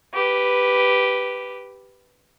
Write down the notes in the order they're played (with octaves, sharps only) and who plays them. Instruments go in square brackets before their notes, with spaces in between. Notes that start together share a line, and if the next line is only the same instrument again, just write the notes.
[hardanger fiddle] G4 B4